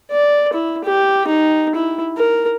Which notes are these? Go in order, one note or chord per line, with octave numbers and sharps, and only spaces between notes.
D5
E4
G4
D#4
E4
A#4